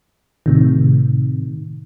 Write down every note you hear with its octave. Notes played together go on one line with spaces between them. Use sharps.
A2 C3 D#3